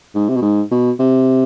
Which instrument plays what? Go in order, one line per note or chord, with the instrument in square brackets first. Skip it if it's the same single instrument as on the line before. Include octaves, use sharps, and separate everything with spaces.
[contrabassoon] G#2
C3
B2
G#2
B2
C3